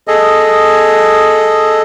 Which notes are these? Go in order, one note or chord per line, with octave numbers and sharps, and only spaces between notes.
G#4 A4 D#5